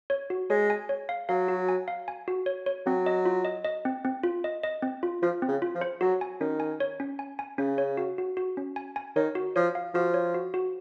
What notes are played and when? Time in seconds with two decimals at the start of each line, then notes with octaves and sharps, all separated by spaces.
0.10 C#5
0.30 F#4
0.50 G#3 C#5
0.70 G#5
0.89 C#5
1.09 F5
1.29 F#3 F5
1.48 F#4
1.69 G#5
1.88 F5
2.08 G#5
2.28 F#4
2.46 C#5
2.66 C#5
2.86 F#3 C4
3.06 D#5
3.26 F4
3.45 D#5
3.65 D#5
3.85 C4
4.04 C4
4.23 F4
4.44 D#5
4.64 D#5
4.82 C4
5.03 F4
5.22 F3 F4
5.42 C4
5.48 C#3
5.62 F4
5.75 F3
5.81 C5
6.01 F#3 F#4
6.21 G#5
6.40 D#3 C#4
6.60 G#5
6.80 C#5
7.00 C#4
7.19 G#5
7.39 G#5
7.58 C#3 C#4
7.78 C#5
7.97 F#4
8.18 F#4
8.37 F#4
8.57 C#4
8.76 G#5
8.96 G#5
9.16 D#3 C#5
9.35 F#4
9.56 F3 C#5
9.75 F5
9.94 F3 F#4
10.14 C#5
10.34 F#4
10.54 F#4